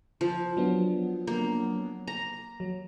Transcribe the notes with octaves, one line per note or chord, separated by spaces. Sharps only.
F3
F#3 B3 D4
A#3
A#5
F#3